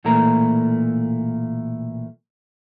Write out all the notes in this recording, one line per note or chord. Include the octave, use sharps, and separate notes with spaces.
B1 A#2 E3 A3 A#3 A#5